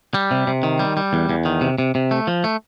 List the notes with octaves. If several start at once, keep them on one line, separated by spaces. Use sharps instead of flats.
G3
C3
C3
D#3
G3
G3
E2
E2
D#3
C3
C3
C3
A3
F3
A3